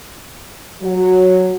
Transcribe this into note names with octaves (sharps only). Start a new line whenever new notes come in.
F#3